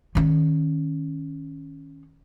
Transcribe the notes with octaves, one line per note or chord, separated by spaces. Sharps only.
D#3 C#4